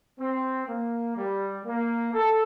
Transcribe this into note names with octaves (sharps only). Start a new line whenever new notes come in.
C4
A#3
G3
A#3
A4